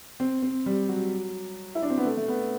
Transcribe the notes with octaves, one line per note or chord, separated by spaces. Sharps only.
C4
C4
G3
F#3
E4
D4
C4
B3
A3
A3
B3